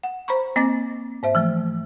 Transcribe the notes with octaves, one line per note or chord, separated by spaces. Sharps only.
F#5
C5 A#5 B5 C#6
A#3 C4 D#5 G#5 D6 A6
G#2 C5 E5
E3 F3 A3